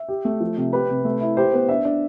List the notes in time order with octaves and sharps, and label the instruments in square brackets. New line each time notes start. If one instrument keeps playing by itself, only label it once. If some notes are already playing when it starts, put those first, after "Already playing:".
Already playing: [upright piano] E5
[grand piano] G4
A3
F3
C3
[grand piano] G4 [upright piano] B4
[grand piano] C3
A3
E4
[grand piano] G4 [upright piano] C5
[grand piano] B3
[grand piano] D4 [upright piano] E5
[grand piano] D4